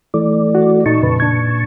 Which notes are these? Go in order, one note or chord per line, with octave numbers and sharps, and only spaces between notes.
E3 A3 D5
F#4
A#2 D#4 A5 C#6
F2 C#3 B4
D4 G#6